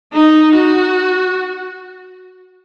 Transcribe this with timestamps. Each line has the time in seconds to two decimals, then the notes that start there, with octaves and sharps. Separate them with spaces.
0.14 D#4
0.56 F#4